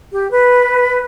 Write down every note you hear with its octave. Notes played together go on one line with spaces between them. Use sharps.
G4
B4